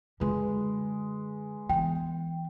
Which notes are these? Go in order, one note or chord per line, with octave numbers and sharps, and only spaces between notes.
F#2 D3 G#3 B4
E3 B3 G5